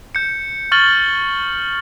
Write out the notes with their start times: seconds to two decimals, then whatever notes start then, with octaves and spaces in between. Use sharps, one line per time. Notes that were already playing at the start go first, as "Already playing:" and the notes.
0.15 G6 C#7
0.72 C#6 F6 A6 F#7 G7